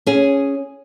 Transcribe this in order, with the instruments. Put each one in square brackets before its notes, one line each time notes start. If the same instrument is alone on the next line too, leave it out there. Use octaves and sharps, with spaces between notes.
[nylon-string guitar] C#4 G#4